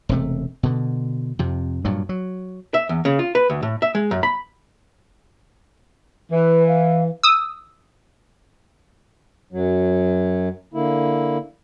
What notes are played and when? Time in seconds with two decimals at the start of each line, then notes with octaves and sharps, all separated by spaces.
0.09 E1 C3 A3
0.63 B2 D3
1.39 F2 C3
1.85 G2 A#2 F#3
2.09 F#3
2.74 E5
2.89 E2
3.05 C#3
3.19 F4
3.35 B4
3.50 D2
3.63 A2
3.82 E5
3.95 G#3
4.11 F#2
4.23 B5
6.32 E3 B4
6.68 F5
7.23 D#6 E6
9.53 F#2 F#3
10.74 D3 A#3 E4